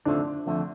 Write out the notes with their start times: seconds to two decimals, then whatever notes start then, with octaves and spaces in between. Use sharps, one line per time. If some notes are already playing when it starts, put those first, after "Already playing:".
0.05 F2 D3 F3 A3 D4
0.46 F2 D3 F3 A3